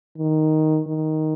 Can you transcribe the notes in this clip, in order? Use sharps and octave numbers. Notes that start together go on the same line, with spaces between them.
D#3
D#3